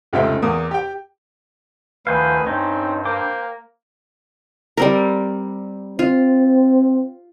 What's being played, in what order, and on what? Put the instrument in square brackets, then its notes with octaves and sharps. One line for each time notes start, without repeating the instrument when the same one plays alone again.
[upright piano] F1 C#2 C#3 F3 E5 G5
E2 A#3 D#6
G4 G5
[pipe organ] D2 D#3 G#5 [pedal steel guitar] F3 C5 F5 [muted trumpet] B4
[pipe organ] G2 [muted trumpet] C4 [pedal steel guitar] C#4 D#4
[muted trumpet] A#3 [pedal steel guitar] C5 G5 D6
[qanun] G3 C4 A#4
[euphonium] C4 [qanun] F4